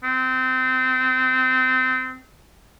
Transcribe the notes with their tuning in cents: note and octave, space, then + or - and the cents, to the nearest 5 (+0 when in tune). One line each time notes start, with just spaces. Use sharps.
C4 -25